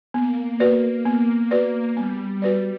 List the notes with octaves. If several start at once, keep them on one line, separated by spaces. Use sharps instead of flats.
A#3 B3
F#4 B4 D5
B3
F#4 B4 D5
G3 B3
F#4 B4 D5